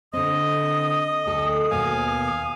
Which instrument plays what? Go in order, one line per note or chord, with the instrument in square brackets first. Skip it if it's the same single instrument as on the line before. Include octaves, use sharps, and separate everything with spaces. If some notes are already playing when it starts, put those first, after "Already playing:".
[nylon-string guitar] D3 C4 [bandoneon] D#5 [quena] D#6
[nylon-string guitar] D2 A4
[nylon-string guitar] D#2 B2 B3 [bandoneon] F5 G#5